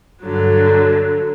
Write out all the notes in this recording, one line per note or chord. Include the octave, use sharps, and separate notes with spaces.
G2 D3 F#3